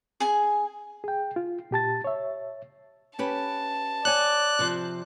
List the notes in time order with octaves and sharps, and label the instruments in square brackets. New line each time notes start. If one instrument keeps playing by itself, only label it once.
[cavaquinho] G#4 G#5
[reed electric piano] G#4 G5
F4
A#2 G4 A5 A6
C#5 E5
[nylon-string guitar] C#4 G4 B4 [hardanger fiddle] A5
[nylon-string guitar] C#5 G#5 [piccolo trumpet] D5 [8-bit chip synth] F#6
[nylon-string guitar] C3 F3 C5